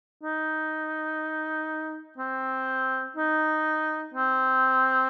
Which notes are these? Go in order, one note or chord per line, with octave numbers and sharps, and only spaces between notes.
D#4
C4
D#4
C4